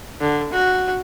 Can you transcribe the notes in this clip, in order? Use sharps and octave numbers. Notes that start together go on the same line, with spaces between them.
D3
F#4